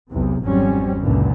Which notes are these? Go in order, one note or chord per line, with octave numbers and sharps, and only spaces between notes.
B1 E2 C3
G#1 F2 F#3 G3 C4 C#4
C#2 F#2 A#2 D3 E3